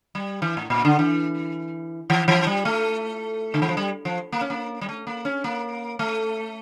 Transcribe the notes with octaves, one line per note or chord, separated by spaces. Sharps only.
G3
E3
A2
A#2
D3
E3
E3
E3
G3
A3
D3
E3
F3
G3
F3
A#3
C#4
A#3
G3
A3
A#3
C#4
A#3
A3